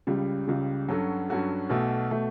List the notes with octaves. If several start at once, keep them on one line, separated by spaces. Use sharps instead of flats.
C#2 C#3 G3
C#2 C#3 G3
G2 F#3 C#4 F#4 A4
G2 F#3 C#4 F#4 A4
B1 B2 A3
B2 A3